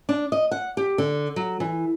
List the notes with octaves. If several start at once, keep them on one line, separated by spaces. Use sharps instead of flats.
D4
D#5
F#5
G4
D3
F#3
E3